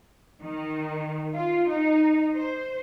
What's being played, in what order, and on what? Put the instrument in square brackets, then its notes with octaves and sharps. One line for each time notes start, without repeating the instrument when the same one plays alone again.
[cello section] D#3
F4
D#4
C5